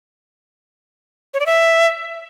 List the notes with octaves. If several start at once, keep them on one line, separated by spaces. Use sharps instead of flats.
C#5
D5
E5